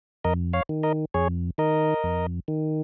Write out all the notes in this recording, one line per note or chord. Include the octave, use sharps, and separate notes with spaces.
F2 A#4 D#5
C#5 F5
D#3
A#4 D#5
F2 G#4 C#5
D#3 A#4 D#5
F2
D#3